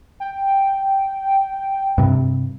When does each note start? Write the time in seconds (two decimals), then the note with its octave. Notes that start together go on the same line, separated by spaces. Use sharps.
0.20 G5
1.98 G2 C3